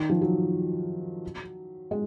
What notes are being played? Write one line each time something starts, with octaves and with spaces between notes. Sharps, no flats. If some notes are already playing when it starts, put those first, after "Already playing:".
Already playing: D#3
F3
F#3
G#3